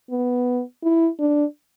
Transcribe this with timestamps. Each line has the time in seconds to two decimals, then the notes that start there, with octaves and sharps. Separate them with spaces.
0.10 B3
0.83 E4
1.19 D4